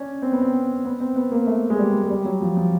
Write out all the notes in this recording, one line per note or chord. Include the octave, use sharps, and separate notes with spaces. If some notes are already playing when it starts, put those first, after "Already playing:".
Already playing: C#4 D4
C4
B3
C4
B3
C4
B3
A#3
A3
G#3
G3
G#3
G3
F#3
F3
F3